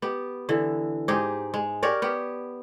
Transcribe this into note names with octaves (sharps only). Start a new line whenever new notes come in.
B3 G4
D3 E3
G#2 D#4 G4 G#4
G#3
G4 A#4 C#5 D5
B3 G4